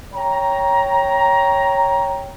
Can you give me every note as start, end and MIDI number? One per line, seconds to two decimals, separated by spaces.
0.14 2.34 73
0.14 2.34 79
0.14 2.34 82